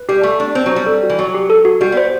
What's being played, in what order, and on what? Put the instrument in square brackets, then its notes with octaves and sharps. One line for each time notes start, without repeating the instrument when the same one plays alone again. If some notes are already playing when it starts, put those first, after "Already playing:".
Already playing: [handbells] B4
[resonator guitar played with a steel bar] G3 [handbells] G4
[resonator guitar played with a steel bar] A3 [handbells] D5
[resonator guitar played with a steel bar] D4 [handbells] D5
[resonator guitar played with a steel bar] C4 [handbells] C5
[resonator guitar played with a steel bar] F#3
[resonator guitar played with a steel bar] G3 [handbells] C5
[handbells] A4
F#4
[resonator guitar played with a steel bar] E3
[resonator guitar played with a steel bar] F#3 [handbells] D5
[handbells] G4
A4
F#4
[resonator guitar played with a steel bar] G3 [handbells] F#4
[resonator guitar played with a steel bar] B3
[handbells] C5